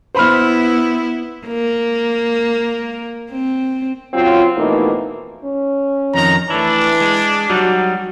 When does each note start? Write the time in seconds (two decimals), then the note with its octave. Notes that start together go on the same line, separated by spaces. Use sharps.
0.15 B3 E4 C5 B5 F6
1.47 A#3
3.30 C4
4.14 C#3 F#3 C4 F4
4.57 F2 B2 E3 A3 A#3 D#4
5.44 C#4
6.14 F2 D#3 A#5
6.50 E3 A3 D4 E4
7.01 G#3
7.50 F#3 G3 D#4 F#4